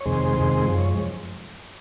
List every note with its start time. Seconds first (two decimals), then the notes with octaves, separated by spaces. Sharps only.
0.01 C#5
0.05 F2 C3 D#3 G#3 G#4 C5
0.37 F2 C3 D#3 G#3
0.67 F#2 F3 G#3
0.78 C#5